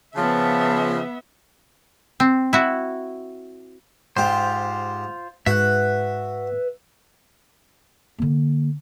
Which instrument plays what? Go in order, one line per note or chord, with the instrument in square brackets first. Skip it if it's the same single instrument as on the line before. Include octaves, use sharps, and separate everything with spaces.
[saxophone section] C#3 F3 [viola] B3 E5 [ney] A5
[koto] C4
E4 F#4
[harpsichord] G#2 G4 [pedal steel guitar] F4 C5
[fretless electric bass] G#2 [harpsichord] F#4 [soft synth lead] B4 [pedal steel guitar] E5 F#6
[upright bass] D3 A#3